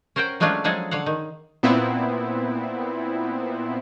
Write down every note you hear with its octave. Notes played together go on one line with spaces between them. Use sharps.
C#4 A#4 C5 F#5 G5
F#3 G#3 A3 C#4 D4 F4
F3 F#3 G#3 G#4 A4
D3 C#5 F5 F#5
D#3
A#2 B3 C4 E4